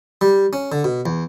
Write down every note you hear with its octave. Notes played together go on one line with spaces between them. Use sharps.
G3
C#4
D3
B2
E2